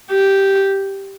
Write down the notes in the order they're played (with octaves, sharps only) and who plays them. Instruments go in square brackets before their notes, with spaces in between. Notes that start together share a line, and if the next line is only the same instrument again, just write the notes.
[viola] G4